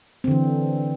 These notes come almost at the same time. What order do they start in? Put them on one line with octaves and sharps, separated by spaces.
C4 D3 E3